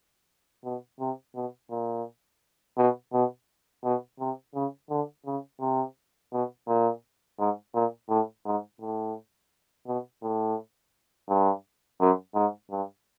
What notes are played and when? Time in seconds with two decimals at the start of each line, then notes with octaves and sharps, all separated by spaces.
0.65 B2
1.00 C3
1.35 B2
1.71 A#2
2.78 B2
3.13 B2
3.84 B2
4.20 C3
4.55 C#3
4.90 D3
5.26 C#3
5.61 C3
6.33 B2
6.68 A#2
7.39 G#2
7.74 A#2
8.09 A2
8.46 G#2
8.81 A2
9.87 B2
10.23 A2
11.29 G2
12.00 F#2
12.35 G#2
12.71 G2